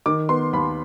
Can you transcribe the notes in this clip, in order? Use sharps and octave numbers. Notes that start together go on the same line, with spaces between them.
D#3 D6
B3 C6
D#2 B5